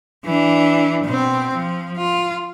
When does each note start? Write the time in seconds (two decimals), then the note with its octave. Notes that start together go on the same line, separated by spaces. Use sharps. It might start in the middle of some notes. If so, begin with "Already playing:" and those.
0.25 E3 D4
1.05 B2 C4
1.54 F3
1.97 F4